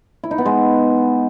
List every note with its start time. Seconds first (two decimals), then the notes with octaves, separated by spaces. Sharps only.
0.24 E4
0.31 D#4
0.38 B3
0.46 G#3